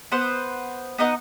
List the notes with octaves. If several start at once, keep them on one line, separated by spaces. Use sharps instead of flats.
B3 B4 C5 F#5
B3 D#4 D#5 F#5